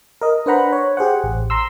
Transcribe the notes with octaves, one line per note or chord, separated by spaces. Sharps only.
A#4 D#5
D4 B4 C5 F#5 A#5 B5
C#5
G4 G#4 C5 F#5
A1
A#5 C6 E6